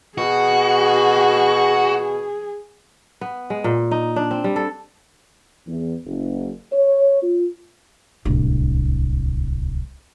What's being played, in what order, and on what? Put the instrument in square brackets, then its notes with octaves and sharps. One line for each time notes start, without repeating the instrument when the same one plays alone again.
[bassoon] B2 [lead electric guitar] F#4 [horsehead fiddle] G#4
[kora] B3
G#3
A#2
D#4
D4
C4
G3
A4
[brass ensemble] E2
F#1
C#5
F4
[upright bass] D1 C2